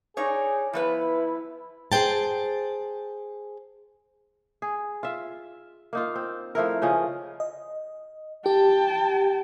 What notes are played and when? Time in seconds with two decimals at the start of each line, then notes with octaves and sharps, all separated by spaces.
0.17 D4 D#4 G#4 C#5
0.73 F3 B3 E4 B4
1.92 G#4 A4 C5 G5 A5
4.62 G#4
5.03 F4 E5
5.93 A#3 D#4 F4
6.15 C4
6.55 F3 A3 E4 A#4
6.82 C#3 F3 C#4 D#5
7.40 D#5
8.46 G4 G5 A5